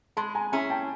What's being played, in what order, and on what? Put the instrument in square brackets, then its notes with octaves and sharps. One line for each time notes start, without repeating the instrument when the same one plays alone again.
[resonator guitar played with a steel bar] G#3 [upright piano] A5 B5
[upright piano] G#5 A#5
[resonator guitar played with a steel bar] C#4 E4 G#4 [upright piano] G#5 A#5
[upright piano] G5 A5